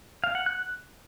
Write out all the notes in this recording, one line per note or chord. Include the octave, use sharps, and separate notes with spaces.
F5
F#5
F#6